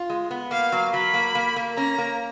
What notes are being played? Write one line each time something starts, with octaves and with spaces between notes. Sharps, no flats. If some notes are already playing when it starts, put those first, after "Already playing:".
Already playing: F4
G#3
B3
A#3 F5
F#3
F#3 B5
A#3
A#3
A#3
C#4 A#5
A#3